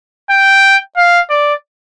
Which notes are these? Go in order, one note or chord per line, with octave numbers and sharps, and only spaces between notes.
G5
F5
D5